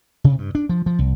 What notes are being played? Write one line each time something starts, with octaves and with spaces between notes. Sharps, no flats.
C3
G2
D4
F3
F3
C2